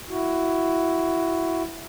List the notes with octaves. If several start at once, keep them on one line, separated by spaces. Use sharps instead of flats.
E4 F#4